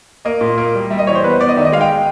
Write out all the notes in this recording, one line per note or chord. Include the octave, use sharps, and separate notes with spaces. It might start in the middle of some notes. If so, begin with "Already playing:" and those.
A#3 D#5
A#2
A#3
G3
G3 E5
D#5
E3 C#5
C5
B3 B4
C5
B3 D5
D#5
D#3 E5
D#5
G#3 F5
G5